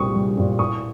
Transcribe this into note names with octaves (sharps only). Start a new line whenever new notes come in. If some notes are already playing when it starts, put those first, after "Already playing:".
Already playing: C2 A#2 G3 C4 C#6 D#6
C2
A#2 G3 C4
A2 C#6 D#6